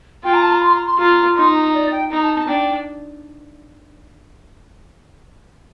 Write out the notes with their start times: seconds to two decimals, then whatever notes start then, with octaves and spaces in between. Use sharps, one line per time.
0.24 F4 G5
0.34 A#5
0.42 A5
0.52 A#5
0.62 C6
0.73 A#5
0.87 C6
0.98 F4 A#5
1.35 D#4 C6
1.55 A#5
1.74 D5
1.92 G5
2.11 D#4 A#5
2.23 A5
2.36 A5
2.48 D4 G5